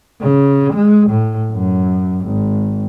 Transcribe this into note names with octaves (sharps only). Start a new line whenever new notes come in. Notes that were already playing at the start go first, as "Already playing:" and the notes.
C#3
G#3
A2
F#2
G#1